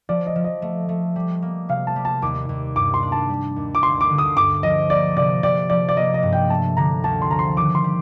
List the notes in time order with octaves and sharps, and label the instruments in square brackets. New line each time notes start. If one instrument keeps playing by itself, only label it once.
[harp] F3 [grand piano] D5
[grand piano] D#5
[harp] F3
[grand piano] D#5
[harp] A3
A3
G3
A#3
[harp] C3 [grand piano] F5
[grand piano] A5
[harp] G3
[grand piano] A5
[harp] D#2 [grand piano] D6
[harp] D#2
[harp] G2 [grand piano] D6
[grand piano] C6
[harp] D4
[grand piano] A5
[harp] G3
D#2
[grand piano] D6
[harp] D2 [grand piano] C6
[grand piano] D6
[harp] D3
[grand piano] D#6
[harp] G2 [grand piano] D6
[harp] F3 [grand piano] D#5
[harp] A#3 [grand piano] D5
[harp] C3 [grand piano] D5
[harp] C3 [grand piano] D5
[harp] F3 [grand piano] D5
[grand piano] D5
[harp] A#3 [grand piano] D#5
[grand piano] D#5
[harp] G2
[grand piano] G5
[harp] A3 [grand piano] A5
[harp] D3 [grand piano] A#5
[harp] D2 [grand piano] A5
[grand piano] C6
[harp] F3 [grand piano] A#5
[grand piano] C6
[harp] D#3 [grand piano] D6
[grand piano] C6
[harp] G3